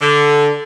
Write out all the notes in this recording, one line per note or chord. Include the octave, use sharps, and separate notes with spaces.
D3